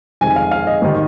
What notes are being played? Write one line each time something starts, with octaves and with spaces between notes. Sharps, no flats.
F2 C3 D#3 G#3 G#5
F5
F5
D#5
G#1 D#3 G3